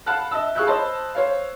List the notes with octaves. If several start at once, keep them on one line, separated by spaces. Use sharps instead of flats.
F5 F#5 A5 B5 F6 F#6
D#5 E5 A5 E6
G#4 F5 C#6 E6 F#6 G6
C5 D#5 A5 B5 C6
C5 C#5 F5